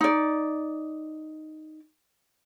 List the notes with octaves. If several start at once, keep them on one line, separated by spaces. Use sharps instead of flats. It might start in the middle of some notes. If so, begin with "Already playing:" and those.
D#4 D5